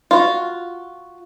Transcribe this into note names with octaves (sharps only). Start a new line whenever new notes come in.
F4 F#4